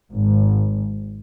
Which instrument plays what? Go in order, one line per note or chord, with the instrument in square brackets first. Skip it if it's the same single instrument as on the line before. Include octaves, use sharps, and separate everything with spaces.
[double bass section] G#1